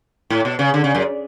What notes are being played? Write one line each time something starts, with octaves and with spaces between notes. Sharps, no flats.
A2
B2
C#3
D3
C#3
F#2